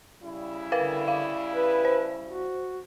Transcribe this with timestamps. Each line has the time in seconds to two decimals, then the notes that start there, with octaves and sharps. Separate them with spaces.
0.22 C#3 G3 E4
0.72 D3 A#4 B4 F5
1.08 F5
1.56 B4
1.85 C5
2.27 F#4